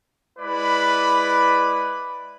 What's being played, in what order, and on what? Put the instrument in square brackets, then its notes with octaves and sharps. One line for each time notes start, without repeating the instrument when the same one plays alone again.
[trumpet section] G#3 E4 B4 D5 B5